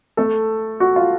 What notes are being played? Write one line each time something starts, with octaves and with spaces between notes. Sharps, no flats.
A3 A4
F#4
F4